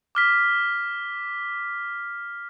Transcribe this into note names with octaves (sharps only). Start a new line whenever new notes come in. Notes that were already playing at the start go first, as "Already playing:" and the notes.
D6 F6 B6